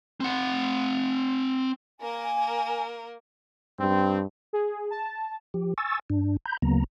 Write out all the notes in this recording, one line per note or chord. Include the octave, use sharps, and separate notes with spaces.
C4 F#5
A#3 A#4 G#5
G2 C4
G#4
A5
F3 G4
G#5 C#6 E6 A6
G2 D4
A#5 B5 G6
D2 C#3 F#3 A#3 B3 A#5